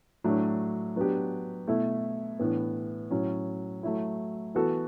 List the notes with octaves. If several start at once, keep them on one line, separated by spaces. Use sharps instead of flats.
A2 F#3 A3 D4
F#3 B3 D4 G4
B2 A3 E4 A4
A2 E3 B3 D4
A2 F#3 C#4
F#3 A3 E4
E3 B3 F#4 A4